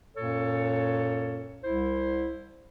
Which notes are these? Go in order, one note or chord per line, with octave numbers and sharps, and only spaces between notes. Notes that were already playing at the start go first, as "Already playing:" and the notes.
F#2 A#2 A#3 A4 C#5
C2 E4 C5